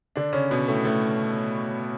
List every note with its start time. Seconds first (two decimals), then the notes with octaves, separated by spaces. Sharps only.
0.16 D3 D4
0.33 C#3 C#4
0.51 B2 B3
0.68 A2 A3
0.85 A2 A3